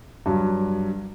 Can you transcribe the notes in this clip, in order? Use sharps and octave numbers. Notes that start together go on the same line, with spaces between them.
G2 F#3